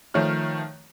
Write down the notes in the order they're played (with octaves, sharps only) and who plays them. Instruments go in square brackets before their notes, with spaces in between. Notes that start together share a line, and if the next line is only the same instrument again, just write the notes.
[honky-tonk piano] D#3 F3 A3 C#5 F6